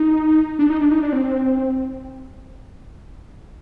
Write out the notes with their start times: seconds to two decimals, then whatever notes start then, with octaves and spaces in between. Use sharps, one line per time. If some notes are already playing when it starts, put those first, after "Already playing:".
Already playing: D#4
0.59 D4
0.70 D#4
0.81 D4
0.91 D#4
1.02 D4
1.13 C4